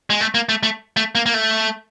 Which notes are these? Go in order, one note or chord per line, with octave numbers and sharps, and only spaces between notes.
G#3
A3
A#3
A3
A3
A3
A#3
A#3
A3